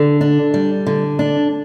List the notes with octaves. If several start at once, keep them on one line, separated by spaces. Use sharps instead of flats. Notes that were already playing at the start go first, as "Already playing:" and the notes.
Already playing: D3
D4
G3
D3
D4